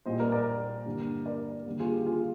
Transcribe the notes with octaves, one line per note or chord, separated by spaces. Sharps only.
A#1 A#2 G3 C5 D#5
A#4 D5
A#4 D5
G2 D3 G3 A#3
A#4 D5
D#2 D3 G3 A#3
F4 G#4
G4
F4 G#4